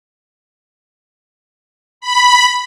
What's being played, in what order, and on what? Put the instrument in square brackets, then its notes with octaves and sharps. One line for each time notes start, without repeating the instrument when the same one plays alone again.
[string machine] B5